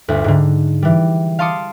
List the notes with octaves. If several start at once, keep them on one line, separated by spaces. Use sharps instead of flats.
G1 D2
G#2 D3
E3 G3
F5 A5 C6 D6 D#6 C#7